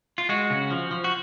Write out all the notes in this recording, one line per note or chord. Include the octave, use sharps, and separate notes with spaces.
F4
G#3 F#4
C#3
F3
F3
F#4